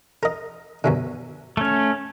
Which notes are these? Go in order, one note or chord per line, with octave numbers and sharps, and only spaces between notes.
A#4 D#5
F#2 B2 D3
A3 C#4